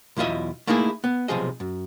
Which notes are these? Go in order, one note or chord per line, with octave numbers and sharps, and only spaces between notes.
B1 E2 E4 F4 D#5 E5
A3 A#3 D#4 E4 G#4
B3
B1 C3 F3 G#4 D#5
F#2